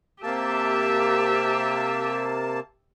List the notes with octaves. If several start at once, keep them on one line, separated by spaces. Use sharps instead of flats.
C3 A#3 G4 E5 A5